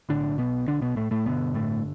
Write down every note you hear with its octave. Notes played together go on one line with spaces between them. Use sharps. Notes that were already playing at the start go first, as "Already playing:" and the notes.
B1 A2 D3 D4
B2 B3
D3 D4
B2 B3
A2 A3
A2 A3
G1 G2 B2 D3 B3
A2 A3